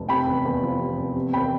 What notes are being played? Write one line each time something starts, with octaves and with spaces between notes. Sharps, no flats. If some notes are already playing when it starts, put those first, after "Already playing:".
Already playing: F1
C3 G5 B5
E2
E2
F3
C3
E2
C3
E2 G5 B5